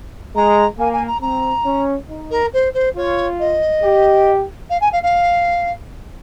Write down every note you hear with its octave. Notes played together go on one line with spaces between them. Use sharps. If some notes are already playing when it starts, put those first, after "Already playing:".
G#3 A#5
A#3 G#5
G#5
A#5
C4 A#5
C#4
D#4
A#4
C5
C5
F4 C#5
D#5
G4
F5
G#5
F5
F5